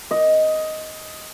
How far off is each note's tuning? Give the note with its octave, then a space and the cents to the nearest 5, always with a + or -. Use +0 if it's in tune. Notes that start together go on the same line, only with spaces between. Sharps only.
D#5 +10